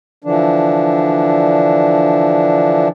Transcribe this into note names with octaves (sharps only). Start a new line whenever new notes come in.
D3 E3 F3 D4